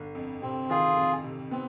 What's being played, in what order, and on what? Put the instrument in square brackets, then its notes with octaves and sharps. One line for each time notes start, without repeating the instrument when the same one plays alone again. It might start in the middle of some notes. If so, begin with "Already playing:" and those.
Already playing: [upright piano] G1
F2
[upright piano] C3 [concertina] C4
[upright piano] D#3 [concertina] F4 G#4
[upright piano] F2
C3
[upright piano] B3 [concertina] C4